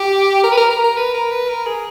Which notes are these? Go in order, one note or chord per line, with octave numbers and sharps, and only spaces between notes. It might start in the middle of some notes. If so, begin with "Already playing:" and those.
Already playing: G4
A#4
B4
A#4
A#4
A#4
B4
A#4
B4
A#4
G#4